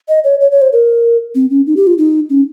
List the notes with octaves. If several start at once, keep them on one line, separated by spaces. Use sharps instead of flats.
D#5
C#5
C#5
C#5
C5
A#4
C4
C#4
D#4
G4
F4
D#4
C#4